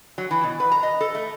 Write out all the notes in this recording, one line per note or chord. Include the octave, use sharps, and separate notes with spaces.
F#3
E3
B2
B4
A#5
D#5
A4
A3